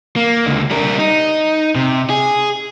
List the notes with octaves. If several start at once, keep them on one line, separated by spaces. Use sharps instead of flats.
A#3
C#2 D3
G3 A#4
D#4
C3
G#4